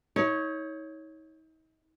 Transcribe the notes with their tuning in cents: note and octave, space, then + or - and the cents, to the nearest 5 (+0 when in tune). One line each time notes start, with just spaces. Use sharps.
D#4 +40 C#5 +0